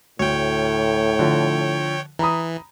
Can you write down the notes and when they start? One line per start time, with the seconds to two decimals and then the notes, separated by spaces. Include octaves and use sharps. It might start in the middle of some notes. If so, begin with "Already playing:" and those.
0.19 D2 A2 C#5 G5
1.19 D3 F3
2.19 E3 A#5 B5 D#6